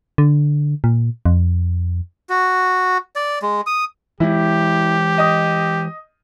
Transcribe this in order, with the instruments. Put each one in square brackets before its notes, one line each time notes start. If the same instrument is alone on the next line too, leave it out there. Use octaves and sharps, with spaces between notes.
[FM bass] D3
A#2
F2
[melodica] F#4
D5
G#3
D#6
[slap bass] E3 G#3 [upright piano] E4 [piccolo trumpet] G4
[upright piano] D#5 D#6